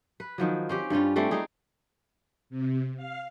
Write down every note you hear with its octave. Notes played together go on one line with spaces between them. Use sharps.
B4
D#3 F3 F#3
C4 C#4 G4
G2 G3 C#4 F4
G3 A3 C4 C#4
C4 D#4 G#4
C3
F5